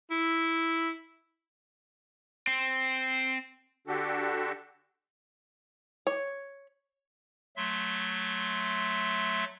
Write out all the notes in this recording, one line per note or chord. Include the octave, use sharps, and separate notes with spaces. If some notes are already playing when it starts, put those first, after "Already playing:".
E4
C4
D3 D4 F#4 G4 A4
C#5
F#3 A3 E5 C6